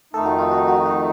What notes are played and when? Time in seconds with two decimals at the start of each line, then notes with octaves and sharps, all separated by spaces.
0.13 F2 D#3 A3 D#4 A4
0.25 F#4
0.38 F4
0.51 F#4
0.68 F#4
0.86 F#4